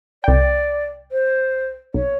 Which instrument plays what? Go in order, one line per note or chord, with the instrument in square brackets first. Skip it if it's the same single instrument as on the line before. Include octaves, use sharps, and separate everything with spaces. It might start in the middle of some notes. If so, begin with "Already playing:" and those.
[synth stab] C2 G5 [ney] D5
[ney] C5
[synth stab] B1 [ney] C#5